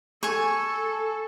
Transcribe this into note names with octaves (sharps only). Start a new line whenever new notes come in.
A4 G#5 C#6